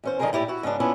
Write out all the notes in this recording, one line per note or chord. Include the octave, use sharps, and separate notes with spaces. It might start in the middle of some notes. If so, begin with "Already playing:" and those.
E2 C#4 C5
D3 D#3 F3 G#3 G#4 A#4
A2 E4 G4 D5
E4 F#4
G#2 C#3 B3 D4
B3 C#4 D4 E4 F4